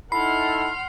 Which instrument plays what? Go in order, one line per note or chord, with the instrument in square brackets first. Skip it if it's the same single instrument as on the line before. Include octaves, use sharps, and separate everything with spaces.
[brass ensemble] D#4 E4 A4 [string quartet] F#5 C6 F6 [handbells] B5 [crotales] C7